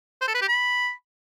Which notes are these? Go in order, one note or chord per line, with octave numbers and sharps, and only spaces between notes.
C5
A4
B4
G4
B5